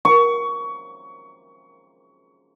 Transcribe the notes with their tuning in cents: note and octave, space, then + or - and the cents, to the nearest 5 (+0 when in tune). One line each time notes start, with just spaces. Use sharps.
C#6 +20